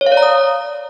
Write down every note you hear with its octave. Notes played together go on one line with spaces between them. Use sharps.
C#5
F5
D5
A#5
D#6